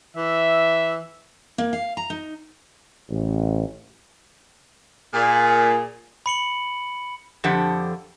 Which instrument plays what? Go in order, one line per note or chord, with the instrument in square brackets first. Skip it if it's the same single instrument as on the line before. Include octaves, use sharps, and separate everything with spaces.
[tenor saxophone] E3 [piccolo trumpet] E5
[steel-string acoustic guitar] A#3
F5
A#5
D#4
[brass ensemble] A1
[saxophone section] A#2 [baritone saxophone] G#4
[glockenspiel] B5 C#7 F#7
[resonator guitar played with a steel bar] F2 D3 F3 G4 F#5